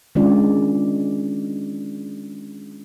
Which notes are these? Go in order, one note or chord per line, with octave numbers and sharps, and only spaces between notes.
D#3 G#3 C#4 D4 F4 D5